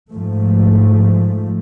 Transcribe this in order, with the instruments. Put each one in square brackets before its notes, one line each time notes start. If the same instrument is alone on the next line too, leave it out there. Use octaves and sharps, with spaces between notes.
[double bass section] G#2 F3 A3